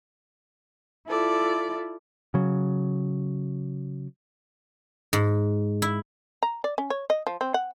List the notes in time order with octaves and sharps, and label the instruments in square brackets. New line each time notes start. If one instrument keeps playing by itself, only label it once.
[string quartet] E4 F4 A4 D5
[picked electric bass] C#3 F#3
[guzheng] G#2
E4
[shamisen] A#5
D5
C#4
C#5
D#5
F3
C4
F#5